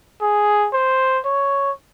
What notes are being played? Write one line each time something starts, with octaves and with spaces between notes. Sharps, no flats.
G#4
C5
C#5